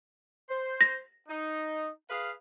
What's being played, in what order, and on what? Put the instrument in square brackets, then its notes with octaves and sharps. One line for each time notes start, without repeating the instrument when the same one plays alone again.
[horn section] C5
[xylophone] A#6
[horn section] D#4
G#4 B4 F5